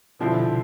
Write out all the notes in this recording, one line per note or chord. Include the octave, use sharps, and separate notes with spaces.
B2 D3 F3 C4 E4
C3